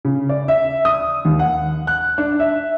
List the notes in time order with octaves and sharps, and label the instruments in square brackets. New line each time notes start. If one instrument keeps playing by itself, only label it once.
[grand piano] C#3
D5
E5
D#6
D#2
F#5
F#6
D4
E5